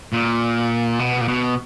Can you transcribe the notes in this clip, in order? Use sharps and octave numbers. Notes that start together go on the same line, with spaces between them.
A#2
B2
A#2
B2